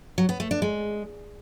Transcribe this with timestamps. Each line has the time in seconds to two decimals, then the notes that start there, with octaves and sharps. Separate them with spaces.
0.18 F#3
0.29 B3
0.40 A3
0.51 D4
0.62 G#3